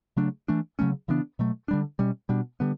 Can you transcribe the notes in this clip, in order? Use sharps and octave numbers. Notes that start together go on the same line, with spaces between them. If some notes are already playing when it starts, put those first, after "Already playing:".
C#3 F#3 A3 D4
E3 A3 D4
C#3 F#3 A3 C#4
C#3 E3 B3 D4
B2 F#3 A3
D3 G3 D4
B2 G3 C#4
B2 G3 D4
D3 G3 B3